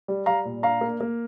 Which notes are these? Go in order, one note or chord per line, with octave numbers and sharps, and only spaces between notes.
G3
G3 F5 A#5
A#2
D4 F5 A#5
A#3
A#3